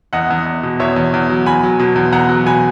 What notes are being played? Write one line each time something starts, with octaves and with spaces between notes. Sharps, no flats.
E2 D#5 F#5
E2
E2
B2
E2 C#5 E5
E2
E2
F#3
E2 G#5 B5
F#3
B2
E2
E2 F#5 A#5
F#3
B2 G#5 B5